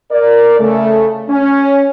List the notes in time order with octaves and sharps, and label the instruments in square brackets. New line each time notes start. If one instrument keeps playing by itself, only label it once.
[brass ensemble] A#4 D5
C#3 A3
C#4